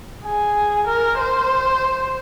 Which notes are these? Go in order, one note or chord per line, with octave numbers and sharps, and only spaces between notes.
G#4
A#4
C5